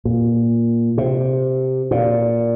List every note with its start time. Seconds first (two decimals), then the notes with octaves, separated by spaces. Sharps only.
0.05 A#2
0.98 C3
1.91 A#2